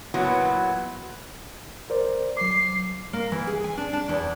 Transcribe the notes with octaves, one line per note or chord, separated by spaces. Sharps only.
A#2 E3 F#3 B3
A#4 C5 D5
F#3 D6 C7
A#3
E3
G#4
G#5
D4
D4
E2